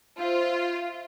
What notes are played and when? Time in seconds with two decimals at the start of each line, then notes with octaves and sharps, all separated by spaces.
0.18 F4 C5 E5